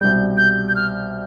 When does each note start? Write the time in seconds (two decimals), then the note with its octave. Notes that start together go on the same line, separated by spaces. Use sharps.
0.01 C2 B2 G3 G6
0.37 G6
0.68 G6
0.75 F6